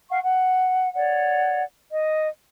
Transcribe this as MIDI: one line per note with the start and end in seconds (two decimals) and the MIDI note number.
0.11 0.19 77
0.11 0.19 78
0.11 0.19 85
0.23 0.91 78
0.94 1.62 73
0.94 1.62 74
0.94 1.62 78
1.92 2.27 75